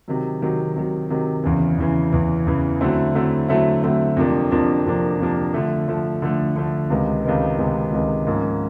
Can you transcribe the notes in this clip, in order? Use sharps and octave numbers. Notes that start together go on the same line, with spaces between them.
C3 D#3 F#3
C3 D#3 F#3
C3 D#3 F#3
C3 D#3 F#3
E2 C#3 E3
E2 C#3 E3
E2 C#3 E3
E2 C#3 E3
D3 F#3 A3 C4 E4
D3 F#3 A3 C4 E4
D3 F#3 A3 C4 E4
D3 F#3 A3 C4 E4
F2 C3 F3 A#3 D4
F2 C3 F3 A#3 D4
F2 C3 F3 A#3 D4
F2 C3 F3 A#3 D4
D3 F3 A3
D3 F3 A3
D3 F3 A3
D3 F3 A3
C#2 C3 D#3 G#3 B3
C#2 C3 D#3 G#3 B3
C#2 C3 D#3 G#3 B3
C#2 C3 D#3 G#3 B3
G#2 F3 A#3 C#4